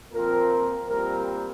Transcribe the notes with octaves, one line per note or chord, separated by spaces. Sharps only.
A#2 F3 C4 A#4
A#2 G3 C4 A#4